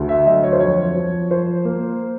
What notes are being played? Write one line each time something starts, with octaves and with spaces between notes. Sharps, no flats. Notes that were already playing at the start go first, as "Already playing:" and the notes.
Already playing: D2 A3
E5
F#3 D#5
C#5
C5
F2 C#5
F3
F3 C5
A#3